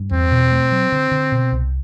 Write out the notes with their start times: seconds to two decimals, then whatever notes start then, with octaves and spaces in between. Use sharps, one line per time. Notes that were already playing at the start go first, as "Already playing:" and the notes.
Already playing: G2
0.11 E2 C4
0.32 B2
0.52 A3
0.72 F#3
0.92 D3
1.11 D3
1.32 B2
1.52 C2